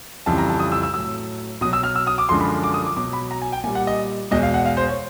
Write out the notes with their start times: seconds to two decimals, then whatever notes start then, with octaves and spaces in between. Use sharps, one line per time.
0.26 F2 C#3 E3 G3 A5
0.38 A#5
0.50 A5
0.60 D#6
0.72 E6
0.83 E6
0.94 A2 F#3 E6
1.61 B2 D#6
1.65 F#3
1.73 E6
1.83 F6
1.96 E6
2.07 D#6
2.18 D6
2.29 F#2 D3 F3 G#3 C6
2.40 B5
2.63 D6
2.74 D#6
2.86 D6
2.96 B2 F#3 D6
3.13 B5
3.31 A#5
3.42 G#5
3.52 G5
3.64 A#2 G#5
3.67 G3
3.75 F#5
3.87 D#5
4.31 E2 B2 G#3 D#5
4.43 F5
4.54 F#5
4.66 F5
4.77 C5
4.88 C#5